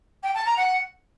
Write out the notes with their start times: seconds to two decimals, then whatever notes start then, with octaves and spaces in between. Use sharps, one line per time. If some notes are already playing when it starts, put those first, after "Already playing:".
0.23 G5
0.34 A5
0.45 A#5
0.57 F#5